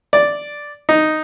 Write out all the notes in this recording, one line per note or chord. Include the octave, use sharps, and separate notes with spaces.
D5
D#4